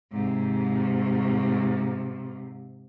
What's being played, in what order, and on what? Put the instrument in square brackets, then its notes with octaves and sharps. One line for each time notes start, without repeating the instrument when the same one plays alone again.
[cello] G#2 C3